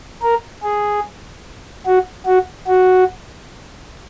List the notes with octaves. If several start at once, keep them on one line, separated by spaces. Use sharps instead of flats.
A#4
G#4
F#4
F#4
F#4